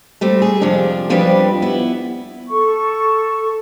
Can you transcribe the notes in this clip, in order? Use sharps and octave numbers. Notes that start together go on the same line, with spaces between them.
G3 A3 C4
G#4
F2 C3 F3 D4
F2 F3 G3 C4 D4 B4
B3 E4
A4 C#6